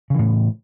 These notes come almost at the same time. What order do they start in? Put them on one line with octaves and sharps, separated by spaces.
C#3 E3 A2